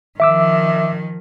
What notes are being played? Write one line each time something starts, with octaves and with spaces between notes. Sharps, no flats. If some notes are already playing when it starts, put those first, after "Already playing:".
D#3 F3 E5 D6 E6